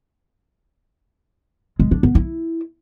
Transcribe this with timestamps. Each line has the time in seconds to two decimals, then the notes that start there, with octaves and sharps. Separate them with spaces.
1.79 G#3
1.91 D4
2.03 B3
2.15 E4